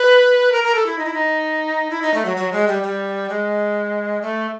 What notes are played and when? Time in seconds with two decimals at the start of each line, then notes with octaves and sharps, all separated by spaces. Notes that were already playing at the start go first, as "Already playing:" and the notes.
Already playing: B4
0.52 A#4
0.64 A#4
0.75 A4
0.86 E4
0.98 D#4
1.05 E4
1.14 D#4
1.90 E4
2.02 D#4
2.14 A3
2.25 F#3
2.37 F#3
2.52 G#3
2.68 G3
2.83 G3
3.30 G#3
4.22 A3